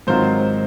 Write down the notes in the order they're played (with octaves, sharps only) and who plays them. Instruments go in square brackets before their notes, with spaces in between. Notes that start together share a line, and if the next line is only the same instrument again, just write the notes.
[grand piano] G#2 D#3 F#3 C4 F4 C5